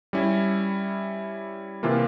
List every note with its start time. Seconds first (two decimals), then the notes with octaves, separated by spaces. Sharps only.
0.13 G3 C#4 E4
1.83 C3 E3 A#3 F4